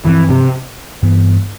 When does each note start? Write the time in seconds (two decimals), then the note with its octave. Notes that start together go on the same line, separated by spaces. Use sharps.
0.05 G2 E3 F3 C4
0.30 C3
1.02 G2 E3 B3